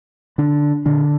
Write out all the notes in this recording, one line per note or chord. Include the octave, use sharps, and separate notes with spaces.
D3 D4
A#2 D3 D4